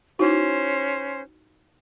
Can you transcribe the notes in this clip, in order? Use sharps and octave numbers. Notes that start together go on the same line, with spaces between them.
C#4 D#4 E4 F#4 C5